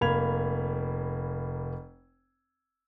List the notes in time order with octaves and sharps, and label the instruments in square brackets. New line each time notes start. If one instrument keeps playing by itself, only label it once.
[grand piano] F1 A#3 B5 G#6 F7